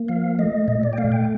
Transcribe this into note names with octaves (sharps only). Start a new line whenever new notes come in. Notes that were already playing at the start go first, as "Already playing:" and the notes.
Already playing: A#3
F3 F5
A3 D#5
A#2 D#5
D5
G5
A3 F5
G5